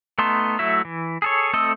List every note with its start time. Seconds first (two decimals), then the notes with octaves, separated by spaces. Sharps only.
0.18 A3 B3 D#4 A5 C6
0.59 F#3 A3 E4 F#4 E5
0.85 E3
1.22 G#4 A4 C#5
1.53 A3 C4 A4 D#5